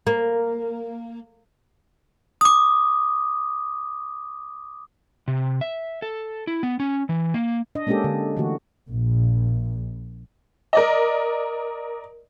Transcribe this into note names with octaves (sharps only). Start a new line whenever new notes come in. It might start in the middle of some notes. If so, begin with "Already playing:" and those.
A#3
D6 D#6
C3
E5
A4
E4
B3
C#4
E3
A#3
D4 D#5
G#3 A#3 C#4 D4 G4 A4
D3
D3 E3 A3 F#4
A#1
A#4 D5 D#5